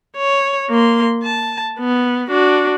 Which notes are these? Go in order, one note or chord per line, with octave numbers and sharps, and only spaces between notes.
C#5
A#3 C6
A5
B3
D4 F#4